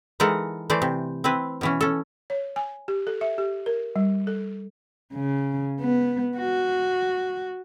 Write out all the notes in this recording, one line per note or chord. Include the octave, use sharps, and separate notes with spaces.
E3 G#3 D#4 A4 A#4 F#5
E3 A3 C5 D5
C3
C4 E4 B4
B2 E3 C#4
C#4 A4
C#5
G#5
G4
A4
E5
G4
A#4
G3
A4
C#3
B3
F#4